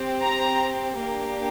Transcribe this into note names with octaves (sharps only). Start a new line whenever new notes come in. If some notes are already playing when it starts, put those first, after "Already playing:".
Already playing: C4 G4
A#5
A#3 D4 G4